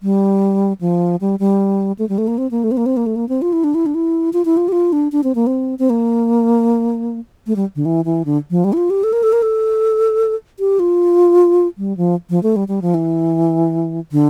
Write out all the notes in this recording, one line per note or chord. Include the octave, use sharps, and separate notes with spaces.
G3
F3
G3
G3
A3
G3
A3
A#3
C4
A#3
A3
C4
A#3
C4
A#3
A3
A#3
C4
F4
E4
D4
E4
D4
E4
F4
E4
F4
G4
F4
D4
D4
C4
A#3
C4
C4
A#3
A3
G3
D3
E3
E3
D3
F3
G3
E4
F4
G4
A4
A#4
A4
A#4
A4
G4
F4
G3
F3
F3
A3
G3
G3
F3
E3
D3